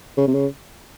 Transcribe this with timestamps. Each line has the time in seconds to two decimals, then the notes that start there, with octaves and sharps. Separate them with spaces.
0.17 C#3
0.28 C3
0.34 C#3